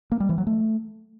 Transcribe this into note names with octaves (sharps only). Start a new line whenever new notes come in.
A#3
G3
E3
F#3
A3